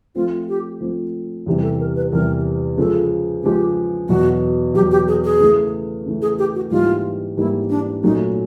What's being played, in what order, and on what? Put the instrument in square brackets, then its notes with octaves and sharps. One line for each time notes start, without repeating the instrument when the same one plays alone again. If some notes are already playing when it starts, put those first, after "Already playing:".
[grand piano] F3 A3 C4 [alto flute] F4
[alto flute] G4
[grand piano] F3 A3 C4
E2 C3 E3 G3
[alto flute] A4
A#4
B4
[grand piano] E2 C3 E3 G3 [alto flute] A#4
[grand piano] C#3 F3 G#3 [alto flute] A4
[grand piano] C#3 F3 G#3 [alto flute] G4
[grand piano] E2 B2 F#3 [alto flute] F#4
[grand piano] E2 B2 F#3 [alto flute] G4
[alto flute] G4
G#4
G#4
[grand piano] C#3 E3 A3
C#3 E3 A3
[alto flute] G#4
G4
F#4
[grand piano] G#2 E3 G3 A#3 D#4 [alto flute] F4
[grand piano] G#2 E3 G3 A#3 D#4 [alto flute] E4
[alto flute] D4
[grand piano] A#2 F#3 A3 C#4 [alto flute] D#4